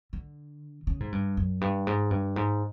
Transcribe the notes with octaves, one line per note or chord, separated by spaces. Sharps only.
D3
C#3
G#2
G2
F#2
G2
G#2
G2
G#2